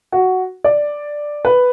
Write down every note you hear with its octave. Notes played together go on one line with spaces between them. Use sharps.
F#4
D5
B4